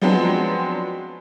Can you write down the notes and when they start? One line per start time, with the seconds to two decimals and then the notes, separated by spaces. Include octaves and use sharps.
0.01 F3 F#3 G#3 B3 C4 D4